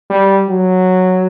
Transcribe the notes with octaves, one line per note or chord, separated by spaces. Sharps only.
G3
F#3